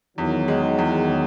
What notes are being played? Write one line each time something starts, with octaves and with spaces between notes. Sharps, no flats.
E2 D#3 F#3
G#3
E2